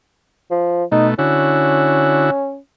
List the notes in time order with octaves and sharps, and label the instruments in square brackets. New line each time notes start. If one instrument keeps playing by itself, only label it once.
[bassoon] F3
[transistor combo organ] B2 A3 [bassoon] D#4
[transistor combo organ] D3 E4 F#4 [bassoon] C#4